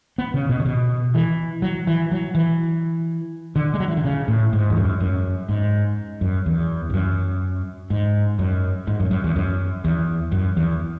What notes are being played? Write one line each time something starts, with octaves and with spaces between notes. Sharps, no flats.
B3
C#3
B2
C#3
B2
E3
F#3
E3
F#3
E3
D3
G#3
F#3
E3
D3
C#3
A2
G#2
E2
F#2
F#2
G#2
F#2
E2
E2
F#2
G#2
F#2
G#2
F#2
F#2
E2
F#2
E2
F#2
E2